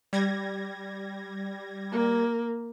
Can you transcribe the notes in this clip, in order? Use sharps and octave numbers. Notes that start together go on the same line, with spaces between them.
G3 G#6 A#6
A#3